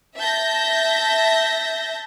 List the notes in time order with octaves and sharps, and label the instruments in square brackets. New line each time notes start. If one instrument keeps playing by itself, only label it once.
[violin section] E5 A5 G6 A#6